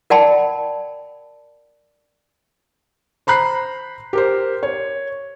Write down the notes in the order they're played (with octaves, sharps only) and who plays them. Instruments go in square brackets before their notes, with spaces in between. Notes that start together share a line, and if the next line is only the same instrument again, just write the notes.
[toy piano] A#4 D5 F#5 G5 A5 B5
[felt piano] C5 A#5 B5 F#6 C7
G4 A#4 C5
C#5